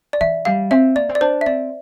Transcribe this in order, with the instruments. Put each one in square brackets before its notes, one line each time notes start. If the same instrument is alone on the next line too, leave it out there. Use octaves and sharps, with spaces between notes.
[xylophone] D5
[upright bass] E3 [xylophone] E5
[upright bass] G3 [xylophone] F5
[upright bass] C4 [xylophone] E5
[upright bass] A#3 [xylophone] D5
[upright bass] C4
[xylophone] D5
[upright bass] D4 [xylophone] C5
[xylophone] E5
[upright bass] C4 [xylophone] D5